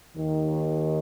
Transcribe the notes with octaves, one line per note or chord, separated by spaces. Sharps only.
D#2 D#3